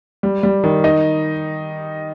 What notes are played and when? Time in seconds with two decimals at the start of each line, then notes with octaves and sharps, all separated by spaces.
0.23 G3
0.43 G3
0.64 D#3
0.84 D#4